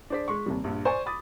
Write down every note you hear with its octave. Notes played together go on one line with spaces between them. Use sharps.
D4 G#4 C5 D5 B6
G#3 C6 C#6
D#2 C3 G3
A#1 G2
C5 D5 G#5 C#6
B5 D6 D#6 A6